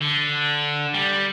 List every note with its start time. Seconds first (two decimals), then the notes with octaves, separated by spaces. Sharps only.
0.02 D3
0.95 G3